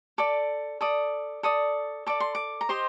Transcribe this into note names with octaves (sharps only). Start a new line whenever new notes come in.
A4 D5 D6
A4 D5 D#6
A4 D5 D#6
A4 D5 D6
C6
D6
A#5
G4 C5 D#5 C6